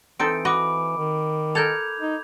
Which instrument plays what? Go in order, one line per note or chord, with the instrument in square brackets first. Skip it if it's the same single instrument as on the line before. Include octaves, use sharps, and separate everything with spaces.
[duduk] E3 [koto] C4 D#4 A4 [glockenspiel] D7
[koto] F#4 D#5 [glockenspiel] B5 D6
[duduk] D#3
[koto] A4 A#4 [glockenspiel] G6 G#6 F7
[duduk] D#4